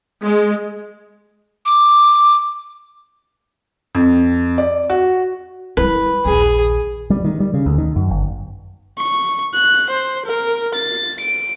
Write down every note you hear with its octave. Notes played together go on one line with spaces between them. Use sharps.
G#3
D6
F2
D5
F#4
G3 E4 B4
A#1 D#2 G#4
G3
D#3
G3
C#3
D2
D#3
F#2
G1
C#6
F#6
C5
A#4
A6
D7